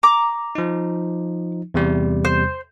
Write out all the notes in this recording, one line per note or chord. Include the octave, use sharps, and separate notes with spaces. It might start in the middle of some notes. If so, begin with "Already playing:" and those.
A#5 D6
F3 D#4
E2 C3 G3
C5